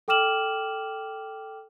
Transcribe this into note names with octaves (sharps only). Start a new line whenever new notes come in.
A4 G5 D6 F6 E7 F#7